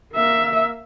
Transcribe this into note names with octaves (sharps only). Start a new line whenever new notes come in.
A#3 E5